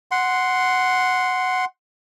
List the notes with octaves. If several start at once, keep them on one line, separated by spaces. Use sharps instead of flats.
F#5 C6